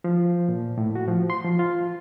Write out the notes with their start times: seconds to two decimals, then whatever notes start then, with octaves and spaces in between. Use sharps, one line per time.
0.04 F3
0.48 A#2
0.78 A2
0.95 F#4
1.08 F3
1.30 C6
1.45 F3
1.59 F4